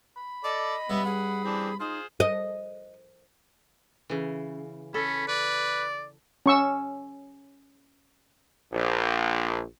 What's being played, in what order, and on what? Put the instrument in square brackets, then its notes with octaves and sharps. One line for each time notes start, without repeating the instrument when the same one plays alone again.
[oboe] B5
[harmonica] A4 D5 [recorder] D#5
[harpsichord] G2 C#4 [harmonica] B3 B4 E5
[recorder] G#4 [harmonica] F#5
[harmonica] E3 C4 D4
[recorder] D#4 [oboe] F4 [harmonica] G#4 C5
[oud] D#5
[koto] C#3 E3
[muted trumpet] C#4 [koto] A4 [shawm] B5
[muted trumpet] B4 [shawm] D5
[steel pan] C#4 C#6 E6
[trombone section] A#1